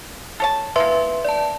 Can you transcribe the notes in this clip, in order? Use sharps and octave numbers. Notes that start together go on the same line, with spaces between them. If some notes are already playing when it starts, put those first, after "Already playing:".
A4 C#5 A5
E3 A#3 B4 E5 C6
D5 A5